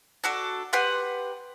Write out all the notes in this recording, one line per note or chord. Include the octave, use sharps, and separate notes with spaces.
D4 F#4 A4
G4 B4 F#5 C6